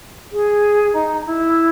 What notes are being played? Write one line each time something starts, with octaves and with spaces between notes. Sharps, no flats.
G#4
D#4
E4